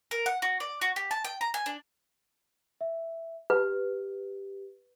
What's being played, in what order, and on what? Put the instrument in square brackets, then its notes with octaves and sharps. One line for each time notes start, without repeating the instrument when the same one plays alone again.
[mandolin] A#4
F#5
F#4
D5
F#4
G4
A5
G5
A#5
G#5
D4
[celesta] E5
[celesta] G4 [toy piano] B4